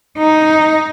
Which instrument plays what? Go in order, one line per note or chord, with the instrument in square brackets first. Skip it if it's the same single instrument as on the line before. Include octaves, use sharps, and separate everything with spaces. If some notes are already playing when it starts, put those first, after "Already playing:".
[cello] D#4